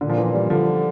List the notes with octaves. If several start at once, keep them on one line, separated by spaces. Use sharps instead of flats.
A#2 D3
F3
E3
G3
D3 F3